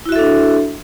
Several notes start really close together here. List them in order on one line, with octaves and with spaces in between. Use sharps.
E4 F#4 E5 A4 D4